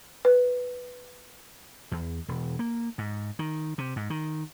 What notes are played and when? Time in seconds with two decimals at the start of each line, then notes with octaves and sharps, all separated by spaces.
0.25 B4
1.91 E2
2.28 E1
2.59 A#3
2.98 G#2
3.39 D#3
3.78 C3
3.96 G#2
4.10 D#3